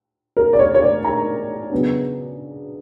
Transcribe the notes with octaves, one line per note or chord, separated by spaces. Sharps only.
A#4
D5
C#5
C#5
D5
A#5
C#3 F#3 B3 D4